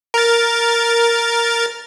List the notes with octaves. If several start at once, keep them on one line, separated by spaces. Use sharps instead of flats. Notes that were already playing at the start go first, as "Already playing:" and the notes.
A#4 A6